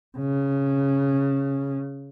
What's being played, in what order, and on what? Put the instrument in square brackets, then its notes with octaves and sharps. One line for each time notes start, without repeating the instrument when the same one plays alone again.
[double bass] C#3